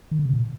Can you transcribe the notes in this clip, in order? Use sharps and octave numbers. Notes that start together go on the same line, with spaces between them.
D#3
D3
C3
A#2